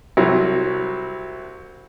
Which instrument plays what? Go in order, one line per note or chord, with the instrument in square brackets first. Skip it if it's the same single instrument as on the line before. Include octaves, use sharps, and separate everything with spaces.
[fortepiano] C2 F#3